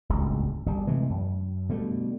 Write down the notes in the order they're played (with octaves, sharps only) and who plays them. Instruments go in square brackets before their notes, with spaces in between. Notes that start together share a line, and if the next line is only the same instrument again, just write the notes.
[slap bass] D1 G1 C#2
G1 G3
C3 E3 G#3 A3
F#2
B2 D3 G3 A3